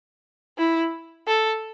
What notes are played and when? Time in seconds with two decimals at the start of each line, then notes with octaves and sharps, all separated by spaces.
0.58 E4
1.27 A4